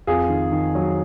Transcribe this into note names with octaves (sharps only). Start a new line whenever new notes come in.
F2 F4 G#4
D#3
D#3
F#3